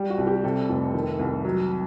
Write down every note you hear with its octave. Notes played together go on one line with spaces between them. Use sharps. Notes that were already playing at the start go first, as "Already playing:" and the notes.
Already playing: G3
F#4
C2
G4
C3 A4
F1
D#3
C2
F#3